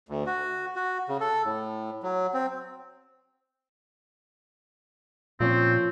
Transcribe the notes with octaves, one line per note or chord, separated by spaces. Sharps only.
D2
F#4
F#4
C#3
A4
A2
F#3
C4
A#2 F3 C4 C#4 C#5